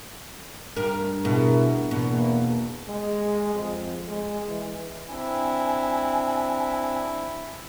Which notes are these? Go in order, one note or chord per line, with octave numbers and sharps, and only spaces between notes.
G2 A#4
B2 E4 G#4 A#4
E2 B2 A#3
G#3
F2
G#3
E3
C4 D4 E4 G#5